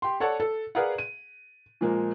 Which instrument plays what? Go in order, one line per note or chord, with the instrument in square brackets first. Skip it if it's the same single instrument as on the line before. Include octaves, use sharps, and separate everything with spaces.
[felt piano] G4 C6
A4 C#5 D5 F#5 A5
A4
G#4 A#4 B4 D5 F5 F#5
D#7
A#2 F3 G#3 A#3